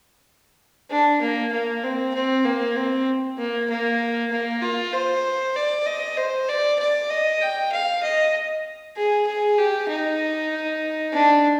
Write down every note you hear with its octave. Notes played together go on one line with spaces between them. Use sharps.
D4
A#3
A#3
C4
C4
A#3
C4
A#3
A#3
A#3
F4
C5
D5
D#5
C5
D5
D5
D#5
G5
F5
D#5
G#4
G#4
G4
D#4
D4